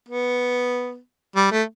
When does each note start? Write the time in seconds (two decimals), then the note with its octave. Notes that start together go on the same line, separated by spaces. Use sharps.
0.09 B3
1.36 G3
1.51 A3